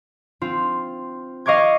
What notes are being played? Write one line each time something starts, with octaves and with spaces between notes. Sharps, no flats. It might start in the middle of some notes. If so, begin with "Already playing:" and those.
C4 F4
D#5 F5 C#6 D6 G#6